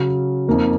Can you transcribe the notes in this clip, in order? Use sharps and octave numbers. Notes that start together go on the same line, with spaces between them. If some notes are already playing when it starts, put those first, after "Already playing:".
Already playing: C#3 F#3 C#4
F2 F3 A#3 D#4